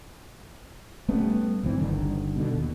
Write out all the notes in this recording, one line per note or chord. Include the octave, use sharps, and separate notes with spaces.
G3 A3 B3 C#4
C#2 G2 E3 C4
G1 G2 D3 D#3
B2 D3
D#2